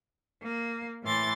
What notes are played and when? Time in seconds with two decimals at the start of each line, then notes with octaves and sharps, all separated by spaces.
0.43 A#3
1.03 A2 E3 C6 A6